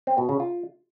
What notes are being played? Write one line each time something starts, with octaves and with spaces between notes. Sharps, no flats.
C4
B2
C#3
F4